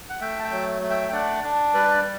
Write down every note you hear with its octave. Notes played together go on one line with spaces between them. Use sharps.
F#5
A3 E5 G5
A5
E5 G5
F#3
A3
E5 G5
G5
D4 D5 F#5
D4
G3 B4 D5